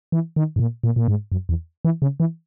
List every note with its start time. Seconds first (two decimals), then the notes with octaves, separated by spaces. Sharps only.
0.12 E3
0.36 D#3
0.56 G#2
0.60 A#2
0.84 A#2
0.96 A#2
1.08 G#2
1.32 F#2
1.49 E2
1.85 E3
2.02 C#3
2.20 E3